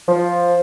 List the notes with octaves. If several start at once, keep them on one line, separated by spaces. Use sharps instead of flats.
F3